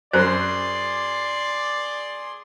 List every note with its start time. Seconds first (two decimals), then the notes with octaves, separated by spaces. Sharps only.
0.13 F#2 G#4 C5 D5 B5 C6